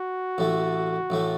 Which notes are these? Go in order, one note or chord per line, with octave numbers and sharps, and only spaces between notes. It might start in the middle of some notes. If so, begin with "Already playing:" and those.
Already playing: F#4
A1 A2 A3
A1 A2 A3